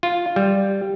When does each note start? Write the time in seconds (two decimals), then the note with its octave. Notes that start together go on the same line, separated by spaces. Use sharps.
0.03 F4
0.36 G3